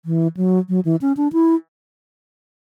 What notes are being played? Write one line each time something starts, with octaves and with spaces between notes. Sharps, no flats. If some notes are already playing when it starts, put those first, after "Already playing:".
E3
F#3
F#3
E3
C#4
D4
E4